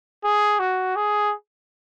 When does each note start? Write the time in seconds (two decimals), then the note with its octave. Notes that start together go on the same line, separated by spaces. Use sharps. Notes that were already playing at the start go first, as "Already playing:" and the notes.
0.24 G#4
0.59 F#4
0.96 G#4